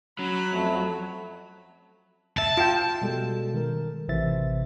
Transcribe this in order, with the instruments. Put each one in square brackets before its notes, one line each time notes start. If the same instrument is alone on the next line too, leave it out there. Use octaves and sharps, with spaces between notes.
[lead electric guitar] F#3 [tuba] C#4 [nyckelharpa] B5
[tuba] F2 [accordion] A3
[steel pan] E5 [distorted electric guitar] A5
[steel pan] F4 G5
[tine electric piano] B2 G3 G#3 A4
D#3 A#4
A1 C3 E3 C5 E5 A6